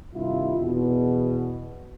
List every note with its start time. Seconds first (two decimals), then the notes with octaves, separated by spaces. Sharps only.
0.14 G2 C3 D#3 E4 F4
0.60 E2 B2